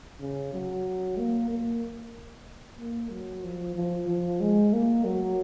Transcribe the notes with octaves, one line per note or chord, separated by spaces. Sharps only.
C#3
F#3
A#3
A#3
A#3
F#3
F3
F3
F3
G#3
A#3
F#3